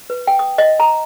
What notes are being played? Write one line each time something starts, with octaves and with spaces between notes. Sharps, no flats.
B4
G5
D#6
D#5
A#5